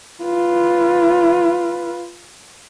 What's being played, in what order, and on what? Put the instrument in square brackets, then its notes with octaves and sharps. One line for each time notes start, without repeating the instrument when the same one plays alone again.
[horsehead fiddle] F4 B4